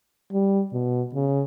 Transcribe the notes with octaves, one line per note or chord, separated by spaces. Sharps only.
G3
B2
C#3